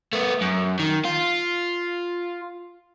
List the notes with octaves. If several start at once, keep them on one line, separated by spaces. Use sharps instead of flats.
A3 B3
F#2
D#3
F4